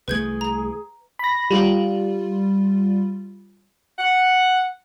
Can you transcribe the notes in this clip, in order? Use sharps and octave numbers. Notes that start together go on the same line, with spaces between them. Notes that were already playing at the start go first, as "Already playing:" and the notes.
C2 E3 A3 G#4 B4 G6 G#6
A#5
B5 A#6
G3 F4
F#5